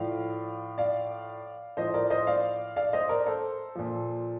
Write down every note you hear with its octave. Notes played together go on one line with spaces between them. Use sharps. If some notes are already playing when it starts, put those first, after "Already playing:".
Already playing: A2 F3 D5 F5
D5 F5
A2 F3 C5 D#5
A#4 D5
C5 D#5
D5 F5
D5 F5
C5 D#5
A#4 D5
A4 C5
A#2 F3